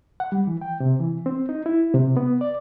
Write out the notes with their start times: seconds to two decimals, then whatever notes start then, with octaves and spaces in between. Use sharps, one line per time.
0.20 F#5
0.32 G3
0.47 E3
0.61 G5
0.80 C3
1.00 E3
1.26 C4
1.49 D#4
1.66 E4
1.94 C3
2.17 B3
2.41 D5